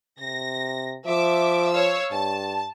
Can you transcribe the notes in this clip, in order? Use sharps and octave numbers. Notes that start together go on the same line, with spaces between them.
C3 A#6
F3 E5 D6
C#5 F5 E6
G2 A5